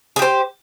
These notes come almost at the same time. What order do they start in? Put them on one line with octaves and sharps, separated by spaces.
G#4 G4 C5